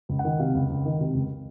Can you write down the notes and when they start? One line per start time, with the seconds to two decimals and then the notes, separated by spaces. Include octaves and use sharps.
0.09 C#2
0.19 F#5
0.24 D#3
0.39 C3 F5
0.54 C#2
0.70 C#2
0.85 D#3
1.00 C3
1.14 C#2